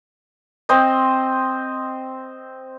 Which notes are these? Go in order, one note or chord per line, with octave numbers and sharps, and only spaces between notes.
C4 C5 D#5